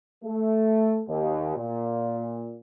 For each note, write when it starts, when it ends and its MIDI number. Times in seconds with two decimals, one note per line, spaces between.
0.24 1.01 57
1.08 1.53 39
1.56 2.57 46